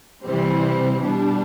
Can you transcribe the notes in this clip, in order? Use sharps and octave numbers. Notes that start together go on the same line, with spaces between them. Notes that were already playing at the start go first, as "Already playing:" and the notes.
C3 E3 G3 C4
B2 G3 D4